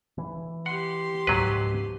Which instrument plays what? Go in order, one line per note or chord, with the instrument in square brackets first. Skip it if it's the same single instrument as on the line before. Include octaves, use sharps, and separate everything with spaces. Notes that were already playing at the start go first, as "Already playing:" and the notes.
[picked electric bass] E3
[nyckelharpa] G4 C6 [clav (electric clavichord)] F#5
[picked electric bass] C#2 G#2 F3 [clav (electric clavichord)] F#3 B4